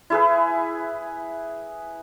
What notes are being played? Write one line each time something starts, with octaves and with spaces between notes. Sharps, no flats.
E4 G#4 B4